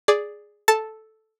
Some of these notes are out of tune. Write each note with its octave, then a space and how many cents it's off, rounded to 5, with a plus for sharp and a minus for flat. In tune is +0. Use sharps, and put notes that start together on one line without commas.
G#4 +0 D5 +0
A4 -5 A5 +0